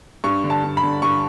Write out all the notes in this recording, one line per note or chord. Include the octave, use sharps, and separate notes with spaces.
G2 C#6
D3
A5
G2
B5
D3
G2 C#6